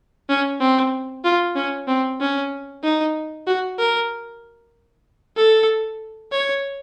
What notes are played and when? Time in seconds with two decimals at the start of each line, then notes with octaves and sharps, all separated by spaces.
0.29 C#4
0.61 C4
1.25 F4
1.56 C#4
1.88 C4
2.20 C#4
2.83 D#4
3.47 F#4
3.79 A#4
5.36 A4
6.32 C#5